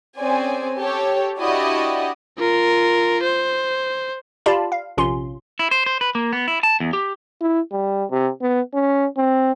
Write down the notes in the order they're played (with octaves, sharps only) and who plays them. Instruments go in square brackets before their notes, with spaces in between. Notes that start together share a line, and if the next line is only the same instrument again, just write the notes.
[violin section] C4 C#4 G#4 C5 D5 G#5
G4 A4 C#5
D4 E4 F#4 G4 D5 D#5
[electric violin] F4 A#4
C5
[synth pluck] F4 G4 D5 F5 A5 B5
F5
A#1 C3 C#4 F4 C6
[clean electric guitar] E4
C5
C5
B4
A#3
B3
E4
A5
E2
G4
[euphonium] E4
G3
C3
B3
C#4
C4